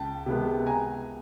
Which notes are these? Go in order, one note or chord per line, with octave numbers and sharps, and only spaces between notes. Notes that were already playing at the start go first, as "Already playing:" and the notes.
Already playing: C#2 G5 A5
C3 D#3 G#3 B3
G#5 A#5